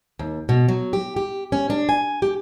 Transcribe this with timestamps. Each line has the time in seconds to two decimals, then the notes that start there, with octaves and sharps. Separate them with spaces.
0.19 D#2
0.49 B2
0.68 F#3
0.93 G4
1.16 G4
1.52 C#4
1.70 D4
1.89 G#5
2.22 G4